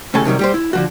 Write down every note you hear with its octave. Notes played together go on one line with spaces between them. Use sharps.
D#2 A2 C#3 A4 G#5 A5
C3 D#3 F#3 G3
G3 G4 C5
E4
D3 F3 F#4